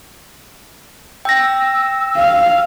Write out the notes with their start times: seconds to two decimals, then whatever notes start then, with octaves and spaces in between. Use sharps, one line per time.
1.25 G5 E6 A#6
2.16 F5